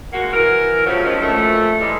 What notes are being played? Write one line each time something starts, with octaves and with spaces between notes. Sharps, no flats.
G#3 A#3 F#4
E3 A#4
C#3 F3 F#3 A3 C#4
A2 D#3 F3 F#3 C#4
F2 A#2 A3
G#2 E3 G3 G#3